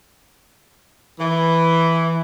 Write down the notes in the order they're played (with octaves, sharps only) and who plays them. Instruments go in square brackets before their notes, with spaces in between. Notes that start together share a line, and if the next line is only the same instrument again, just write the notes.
[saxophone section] E3